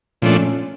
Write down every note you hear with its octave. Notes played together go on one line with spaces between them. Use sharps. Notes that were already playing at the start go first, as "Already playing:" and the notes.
A#2 F3 A3 C#4 D4